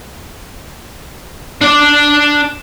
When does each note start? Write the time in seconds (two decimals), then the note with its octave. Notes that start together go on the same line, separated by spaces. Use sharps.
1.61 D4 D5